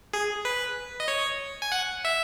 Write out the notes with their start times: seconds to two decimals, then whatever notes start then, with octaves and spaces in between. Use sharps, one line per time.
0.13 G#4
0.45 B4
1.00 D#5
1.08 C#5
1.62 G#5
1.72 F#5
2.05 E5